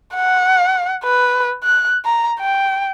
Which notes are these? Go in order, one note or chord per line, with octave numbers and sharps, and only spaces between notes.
F#5
B4
F#6
A#5
G5